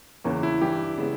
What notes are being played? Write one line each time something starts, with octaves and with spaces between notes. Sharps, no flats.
E2 C#3 E3 A#3 C#4
E4
G2 E3 G3 G4
C#3 G#3 B3